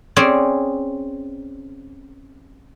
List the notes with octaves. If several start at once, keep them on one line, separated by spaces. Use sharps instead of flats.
C4 C#4 G#4 D5